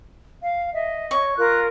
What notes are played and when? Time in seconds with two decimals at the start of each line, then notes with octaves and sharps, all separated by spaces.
0.42 F5
0.74 D#5 E5
1.11 C#5 C#6
1.37 F4 A#4 F#6